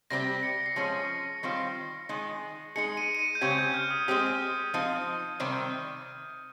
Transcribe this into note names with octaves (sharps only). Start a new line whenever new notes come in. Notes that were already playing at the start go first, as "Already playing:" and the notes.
C3 G3 C4 G4 A#6
C#7
C7
F3 G#3 C#4 C#7
D#3 G3 C4 F4
D#3 G#3 D#4
G#3 D#4 G#4 C#7
D#7
D#7
C#7
G6
C#3 G#3 C4 G4 G#6
G6
F6
D#6
G#3 C4 G4 D#6
F3 C4 D#4
C3 D#3 G3 C4